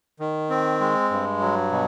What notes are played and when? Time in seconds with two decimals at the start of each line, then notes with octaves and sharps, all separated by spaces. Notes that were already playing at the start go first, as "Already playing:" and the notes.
0.20 D#3
0.50 C4
0.80 G#3
1.10 G2
1.40 F#3
1.72 B2